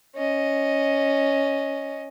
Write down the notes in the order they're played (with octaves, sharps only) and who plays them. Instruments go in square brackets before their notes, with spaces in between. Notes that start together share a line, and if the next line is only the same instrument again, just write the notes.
[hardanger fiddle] C#4 D#5